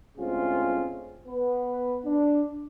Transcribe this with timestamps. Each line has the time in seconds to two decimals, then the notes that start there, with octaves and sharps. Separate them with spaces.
0.18 D2 G#3 C4 C#4 F4 G#4
1.28 B3 B4
2.05 D4